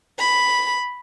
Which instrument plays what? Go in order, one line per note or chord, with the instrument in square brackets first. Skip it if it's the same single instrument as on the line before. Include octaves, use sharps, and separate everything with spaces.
[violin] B5